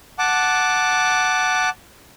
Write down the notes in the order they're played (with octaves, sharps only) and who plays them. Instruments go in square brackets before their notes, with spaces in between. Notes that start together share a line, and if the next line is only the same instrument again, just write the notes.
[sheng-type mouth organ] F#5 A5 D6